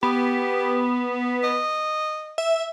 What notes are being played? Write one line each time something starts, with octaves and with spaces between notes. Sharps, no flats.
B3 G4
D#5
E5